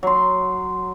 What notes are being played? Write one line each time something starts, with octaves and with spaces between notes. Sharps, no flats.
F#3 C6